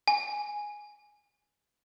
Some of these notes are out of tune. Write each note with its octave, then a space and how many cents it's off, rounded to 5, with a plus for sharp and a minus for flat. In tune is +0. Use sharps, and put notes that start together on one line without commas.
G#5 +0